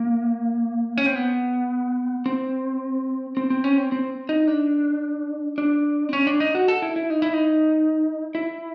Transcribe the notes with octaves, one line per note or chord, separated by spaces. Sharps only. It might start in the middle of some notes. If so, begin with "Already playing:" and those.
Already playing: A#3
C#4
C4
B3
C4
C4
C4
C#4
C4
C4
D#4
D4
D4
C4
C#4
D4
D#4
F#4
A4
E4
E4
D#4
E4
D#4
E4